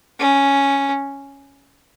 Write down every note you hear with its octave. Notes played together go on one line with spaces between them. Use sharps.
C#4